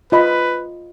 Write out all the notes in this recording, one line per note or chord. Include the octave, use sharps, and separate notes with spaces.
F4 B4 D#5 B5